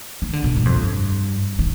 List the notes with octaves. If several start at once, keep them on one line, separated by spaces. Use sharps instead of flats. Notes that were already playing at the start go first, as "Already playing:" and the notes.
D#3
D3
B2
G2
F2
G2
D#3